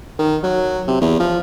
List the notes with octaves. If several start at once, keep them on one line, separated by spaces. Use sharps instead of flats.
D#3
F#3
C3
E2
F3